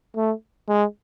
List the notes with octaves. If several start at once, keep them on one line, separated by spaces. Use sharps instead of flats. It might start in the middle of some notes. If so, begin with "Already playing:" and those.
A3
G#3